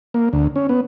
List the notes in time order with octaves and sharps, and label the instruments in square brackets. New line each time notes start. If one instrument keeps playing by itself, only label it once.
[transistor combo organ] A#3
D2
C#4
B3